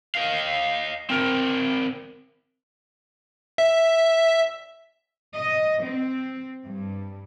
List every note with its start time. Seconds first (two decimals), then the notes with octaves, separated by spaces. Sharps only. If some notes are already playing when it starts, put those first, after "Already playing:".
0.15 D#5 F5
1.10 C4 A#4
3.58 E5
5.34 D#5
5.86 C4
6.65 G2